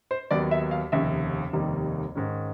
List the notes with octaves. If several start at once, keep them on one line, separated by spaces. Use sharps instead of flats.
C5
D#2 D#3 F#3 B3 D5
E5
F5
F1 D#2 C#3 E5
F1 D#2 D#3 G3 A#3
G#2 D#3 G#3 C#4